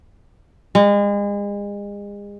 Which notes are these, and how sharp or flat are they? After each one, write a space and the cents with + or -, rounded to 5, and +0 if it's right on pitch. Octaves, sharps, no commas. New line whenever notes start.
G#3 -35